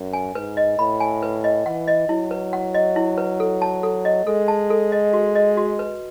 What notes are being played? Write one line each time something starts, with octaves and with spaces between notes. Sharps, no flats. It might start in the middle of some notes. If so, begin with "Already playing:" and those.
Already playing: F#2
G#5
G#2 B4
D#5
A2 B5
G#5
B4
D#5
E3 F#5
D#5
F#3 E4
B4
F#5
D#5
E4
B4
A4
A5
A4
D#5
G#3 A4
A5
A4
D#5
F#4
D#5
F#4
B4